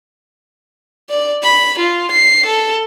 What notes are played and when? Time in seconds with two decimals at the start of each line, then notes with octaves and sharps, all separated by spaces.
1.10 D5
1.43 B5
1.79 F4
2.12 C7
2.47 A4